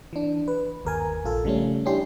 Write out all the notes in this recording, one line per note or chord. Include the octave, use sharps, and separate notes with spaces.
E3 D4
B4
G1 D#2 A#4 G#5
A#1 F4 A4
C#3 F3 G3 A3 C#4
C#4 D4 E4 G4 C6